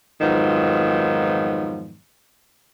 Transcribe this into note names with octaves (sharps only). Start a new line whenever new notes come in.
F2 G#2 D#3 F3 F#3 B3